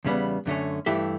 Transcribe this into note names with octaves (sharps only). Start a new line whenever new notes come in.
E2 C#3 G3 B3
F#2 D3 A3 C#4
G2 E3 A3 E4 G4